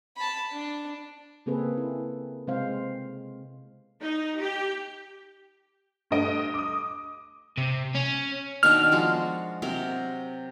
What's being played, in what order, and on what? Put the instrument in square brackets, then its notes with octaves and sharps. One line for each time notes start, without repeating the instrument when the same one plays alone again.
[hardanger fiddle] A5 B5
D4
[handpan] C#3 A#3 C4 G#4 A4 B4
E4
C3 G#3 C4 C5 F5
[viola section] D#4
G4
[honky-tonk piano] G2 A3 D#5 D7
D6 D#6
[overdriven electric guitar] C3
C#4
[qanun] B2 D#3 D4 [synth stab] F6
[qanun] F3 G#3 F#4
C3 F#3 A#4